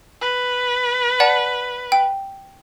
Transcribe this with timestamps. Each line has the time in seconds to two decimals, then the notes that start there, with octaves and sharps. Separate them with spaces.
0.21 B4
1.20 D5 F#5 A5
1.92 G5